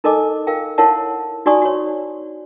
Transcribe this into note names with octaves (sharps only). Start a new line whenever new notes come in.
D#4 A4 A#4 D#5 G#5 D6
A#4 F5 G5
E4 A#4 C#5 F5 F#5 A5
D#4 F#4 D5 G#5 C#6 D#6
F#4 C#5